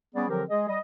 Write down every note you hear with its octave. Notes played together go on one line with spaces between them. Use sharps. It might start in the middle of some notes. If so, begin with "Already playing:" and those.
G3 B3 C#4 G#4 D5
D3 F3 F#3 C4 G4 A#4
G#3 G#4 D#5
G3 D#5